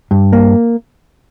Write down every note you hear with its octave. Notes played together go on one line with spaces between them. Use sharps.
G2
A#3